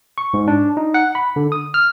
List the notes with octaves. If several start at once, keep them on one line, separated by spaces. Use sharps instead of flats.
C#6
G#2
D4
D#4
F#5
B5
D3
D#6
F6